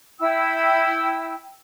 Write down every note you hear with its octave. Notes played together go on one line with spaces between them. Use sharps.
E4 G5 E6